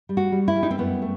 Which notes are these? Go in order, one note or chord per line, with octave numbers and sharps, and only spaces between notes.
G3
F#4
G3
E4
G3
D#4
C4
F#2 B3
A3